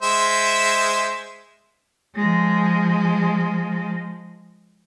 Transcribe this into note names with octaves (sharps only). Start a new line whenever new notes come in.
G#3 C5 E5
F3 G#3